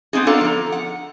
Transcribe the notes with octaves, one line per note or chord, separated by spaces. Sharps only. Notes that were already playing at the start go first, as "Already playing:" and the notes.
B3 C4 D#4 G#4
B3 D4 F4 A4 F5 A#5
F3 A#5
F#5